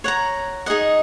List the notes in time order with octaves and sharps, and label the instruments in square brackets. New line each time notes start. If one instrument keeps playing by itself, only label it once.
[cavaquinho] C#5 F#5 A#5
D#4 G#4 D#5 F#5